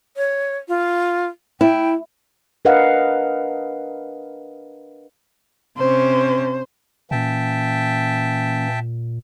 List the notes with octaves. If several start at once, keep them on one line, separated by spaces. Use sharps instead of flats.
C#5
F4
E4 G5
D4 A#4 B4 D#5 F5 F#5
C3 C#4 C5
A#2 E3 A#3 C#4 E5 G5 A5